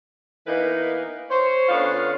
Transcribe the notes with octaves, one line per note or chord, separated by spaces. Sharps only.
E3 A#3 B3 D#4 A#4 B4
C5 C#5
D3 B3 C#4 F4 F5